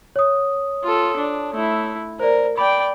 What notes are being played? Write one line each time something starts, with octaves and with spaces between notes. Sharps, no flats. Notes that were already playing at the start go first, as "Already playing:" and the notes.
C#5 D#6
F4 A4
D4
A3 E4
A#4 C5 D5
D5 G5 B5